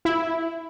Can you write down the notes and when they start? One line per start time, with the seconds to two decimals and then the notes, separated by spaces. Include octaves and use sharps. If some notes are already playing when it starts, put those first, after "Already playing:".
0.05 E4